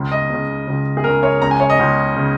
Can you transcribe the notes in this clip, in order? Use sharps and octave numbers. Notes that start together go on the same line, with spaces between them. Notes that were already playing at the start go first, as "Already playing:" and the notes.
Already playing: C#2 C#3
D#5
C#2 C#3
C#2 C#3
G#4
C#2 C#3 A#4
C#5
C#2 C#3 A#5
G#5
C#5
D#5
C#2 C#3
C#3